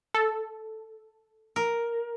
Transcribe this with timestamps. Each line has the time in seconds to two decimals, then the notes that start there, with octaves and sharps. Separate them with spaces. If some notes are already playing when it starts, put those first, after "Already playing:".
0.14 A4
1.56 A#4